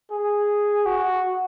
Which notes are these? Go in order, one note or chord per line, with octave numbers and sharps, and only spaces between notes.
G#4
F#4